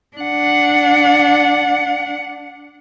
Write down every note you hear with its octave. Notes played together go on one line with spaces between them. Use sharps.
D4 F#5